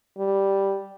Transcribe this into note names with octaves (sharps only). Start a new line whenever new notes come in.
G3